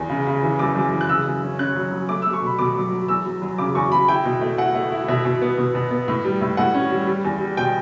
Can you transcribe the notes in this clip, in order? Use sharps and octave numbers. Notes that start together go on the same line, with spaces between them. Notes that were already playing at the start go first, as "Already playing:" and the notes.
Already playing: E2
C#3
C#3
E3
F#2 D6
F#2
E3
F#6
C#3 E6
F#2
C#4
C#4 F#6
F#3
F#3
A3 D6
E6
A3
C#6
B2 B5
B2 D6
F#3
F#3
E2 E6
F#3
F#3
C#3 D6
E2 C#6
E2 B5
E4 G5
B2
A3
E4 F#5
A3
E4
B2 E5
B2
B3
B2
B2
B3
A2
G3
A2
A2 F#5
C#4
G3
G3
E2
G3
B2 G5